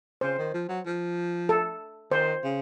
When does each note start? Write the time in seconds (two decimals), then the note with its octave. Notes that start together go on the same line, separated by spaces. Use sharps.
0.21 C#3 C5
0.38 D#3
0.54 F3
0.69 F#3
0.86 F3
1.49 A4
2.11 D#3 C5
2.44 C#3